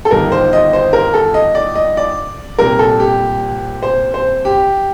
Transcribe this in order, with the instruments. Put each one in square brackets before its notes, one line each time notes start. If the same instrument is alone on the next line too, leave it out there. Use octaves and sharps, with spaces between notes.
[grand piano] A4
G1 G2 D#3 A#4
C5
D#5
C5
A#4
A4
D#5
D5
D#5
D5
C2 A#2 G3 A#4
A4
G4
C5
C5
G4